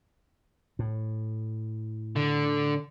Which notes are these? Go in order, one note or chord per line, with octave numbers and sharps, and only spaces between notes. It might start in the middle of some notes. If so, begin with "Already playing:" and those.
A2
D3